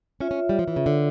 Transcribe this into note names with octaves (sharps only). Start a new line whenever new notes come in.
C#4 F4 C#5 E5
C#4
G3
F3
E3
C#3
D3